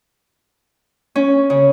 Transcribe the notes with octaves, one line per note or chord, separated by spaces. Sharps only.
C#4
C#3